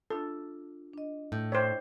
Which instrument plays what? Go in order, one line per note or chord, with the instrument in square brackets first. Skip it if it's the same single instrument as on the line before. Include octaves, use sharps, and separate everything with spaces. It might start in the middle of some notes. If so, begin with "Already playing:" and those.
[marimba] D4 F4 [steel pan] A4
[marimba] D4 D#5
[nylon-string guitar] A2 [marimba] G6
[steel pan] C5 C#5 [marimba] D#5 G5 D6